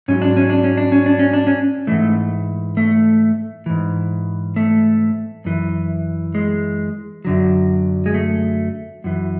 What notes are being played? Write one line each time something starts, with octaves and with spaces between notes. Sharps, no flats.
G#2 F#3 C#4
D4
C#4
D4
C#4
D4
C#4
D4
C#4
D4
C#4
G#2 E3 A3
A3
G#2 E3
A3
F#2 E3
G#3
F#2 D3 F#3
G#3
A3
F#2 E3